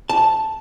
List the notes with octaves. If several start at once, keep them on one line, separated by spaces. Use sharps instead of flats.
A5